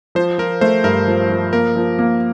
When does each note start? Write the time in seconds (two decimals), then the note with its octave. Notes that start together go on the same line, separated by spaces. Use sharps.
0.15 F3 C5
0.38 F3 A#4
0.61 A3 C5
0.84 G2 A#4
1.07 F3
1.29 F3
1.53 A#3 A#4
1.76 F3
1.99 A#3